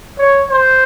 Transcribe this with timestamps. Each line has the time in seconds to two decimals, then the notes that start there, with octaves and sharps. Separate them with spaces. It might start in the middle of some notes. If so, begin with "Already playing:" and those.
0.19 C#5
0.50 C5